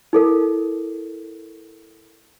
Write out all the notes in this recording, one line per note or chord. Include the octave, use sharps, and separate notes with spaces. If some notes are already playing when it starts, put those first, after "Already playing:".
E4 A4 A#4